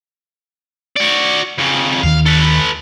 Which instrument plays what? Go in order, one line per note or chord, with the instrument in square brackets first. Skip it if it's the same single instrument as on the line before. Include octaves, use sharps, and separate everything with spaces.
[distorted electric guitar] F#4 D5
F2 C#3
[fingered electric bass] D#2 D#3 [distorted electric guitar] F5
[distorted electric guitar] A4 B4